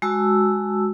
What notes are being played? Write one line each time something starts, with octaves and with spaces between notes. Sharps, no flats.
G#3 F#4 A5 E6